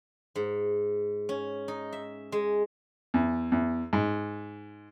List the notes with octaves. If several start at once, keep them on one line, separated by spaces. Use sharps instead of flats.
G#2
C#4
D#4
E5
G#3
E2
E2
G#2